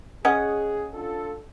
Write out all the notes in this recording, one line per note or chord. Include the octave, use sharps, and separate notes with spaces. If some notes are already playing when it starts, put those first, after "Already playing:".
C#4 G#4 D#5 F#5
D4 F4 A4